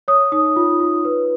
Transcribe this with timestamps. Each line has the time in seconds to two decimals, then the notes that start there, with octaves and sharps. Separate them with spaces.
0.08 C#5 D#6
0.32 D#4 D#6
0.56 F4
0.80 F4
1.05 B4